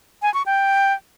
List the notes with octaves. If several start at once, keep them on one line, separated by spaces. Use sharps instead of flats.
G#5
C#6
G5